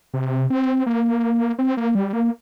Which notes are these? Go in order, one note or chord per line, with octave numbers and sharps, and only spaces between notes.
C3
C4
A#3
C4
A#3
G3
A#3